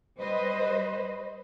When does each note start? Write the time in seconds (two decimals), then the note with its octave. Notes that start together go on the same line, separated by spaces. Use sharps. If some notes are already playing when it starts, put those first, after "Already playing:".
0.19 G3 B4 C5 D#5